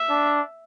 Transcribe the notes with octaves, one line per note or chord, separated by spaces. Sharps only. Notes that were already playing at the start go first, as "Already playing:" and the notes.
Already playing: E5
D4